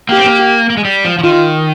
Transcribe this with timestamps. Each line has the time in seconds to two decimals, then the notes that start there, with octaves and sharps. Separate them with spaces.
0.09 A#3 G4
0.17 C4
0.25 A#3
0.70 A#3
0.77 G#3
0.85 G3
1.05 F3
1.19 F3
1.23 D#3 F4